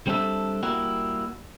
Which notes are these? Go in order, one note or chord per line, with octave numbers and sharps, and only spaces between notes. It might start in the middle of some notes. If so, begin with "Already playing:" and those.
G3 C4 D4 A4 E5
G3 A#3 E4 F#4